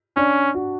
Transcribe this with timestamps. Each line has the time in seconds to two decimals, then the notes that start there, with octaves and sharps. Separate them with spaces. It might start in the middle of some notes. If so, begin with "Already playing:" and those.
0.17 C#4 D4
0.54 F#4